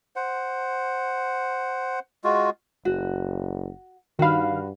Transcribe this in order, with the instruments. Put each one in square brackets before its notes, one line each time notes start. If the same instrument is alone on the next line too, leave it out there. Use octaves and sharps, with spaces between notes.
[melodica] C5 F#5
G#3 F4 F#4
[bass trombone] F#1 [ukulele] F#4
[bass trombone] G2 [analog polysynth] D#3 F5 [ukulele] F#4 B5